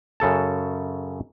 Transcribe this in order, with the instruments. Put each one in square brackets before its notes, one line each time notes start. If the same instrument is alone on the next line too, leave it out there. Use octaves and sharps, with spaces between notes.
[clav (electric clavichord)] F#2 C#3 A4 A5